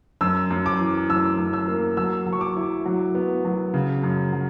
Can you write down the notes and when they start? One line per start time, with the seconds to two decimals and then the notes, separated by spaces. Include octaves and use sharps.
0.21 F#2 E6
0.50 F#2
0.66 D6
0.80 E3
1.09 F#2 E6
1.38 F#2
1.53 E6
1.68 A#3
1.97 F#3 E6
2.26 F#3
2.33 C#6
2.41 D6
2.57 E4
2.86 F#3
3.15 B3
3.45 F#3
3.74 C#3
4.03 F#2
4.33 F#3